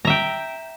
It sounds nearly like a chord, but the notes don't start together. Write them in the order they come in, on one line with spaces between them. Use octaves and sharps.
A#5 E5 G5